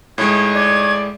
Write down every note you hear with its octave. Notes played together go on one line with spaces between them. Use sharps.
A2 G#3 D#4 C#5 G#6
D5 G#6